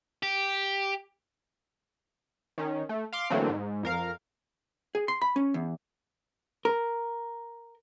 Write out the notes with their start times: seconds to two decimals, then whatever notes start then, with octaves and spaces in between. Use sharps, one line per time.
0.23 G4
2.58 D#3 C#4
2.89 A3
3.13 F5 C6 D6
3.30 D3 E3 F#3 A3 A#3 C4
3.49 G#2
3.83 F2 A#4 F5
4.95 G#4
5.08 C6
5.22 B5
5.36 C#4
5.54 E2
6.65 A#4